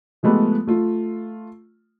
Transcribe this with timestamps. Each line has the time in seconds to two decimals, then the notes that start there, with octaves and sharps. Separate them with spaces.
0.23 F3 G#3 A3 B3 F4 G4
0.67 A3 F4